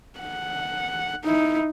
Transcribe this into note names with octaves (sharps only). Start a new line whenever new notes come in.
F#5
D#4 E4